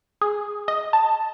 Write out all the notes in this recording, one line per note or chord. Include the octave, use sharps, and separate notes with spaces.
G#4
D#5
A5